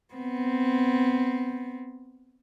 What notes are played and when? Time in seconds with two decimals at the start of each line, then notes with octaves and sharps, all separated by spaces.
0.14 B3 C4